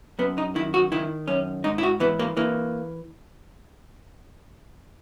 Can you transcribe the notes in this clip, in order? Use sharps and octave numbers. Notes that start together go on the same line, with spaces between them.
F#2 B3
D#4
D#3 E4
F#4
D#3 E4
F#2 C#4
G#2 D#4
E4
F#4
E3 B3
A#3
E3 A#3